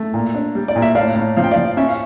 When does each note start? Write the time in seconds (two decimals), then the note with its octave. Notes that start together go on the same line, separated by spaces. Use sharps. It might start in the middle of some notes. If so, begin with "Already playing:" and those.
Already playing: A3
0.14 A#2
0.34 D4
0.55 G3
0.68 D5
0.76 A#2
0.82 E5
0.95 A2 D5 F5
1.16 A2
1.36 F3 F5
1.44 G5
1.51 D5 F5
1.56 F3
1.77 C#4 E5
1.88 F5